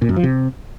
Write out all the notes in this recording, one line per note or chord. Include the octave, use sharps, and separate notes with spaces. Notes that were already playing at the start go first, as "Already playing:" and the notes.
A#2
F#2
F3
C3